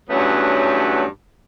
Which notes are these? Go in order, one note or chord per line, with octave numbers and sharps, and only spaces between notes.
E2 G2 F#3 A3 B3 C#4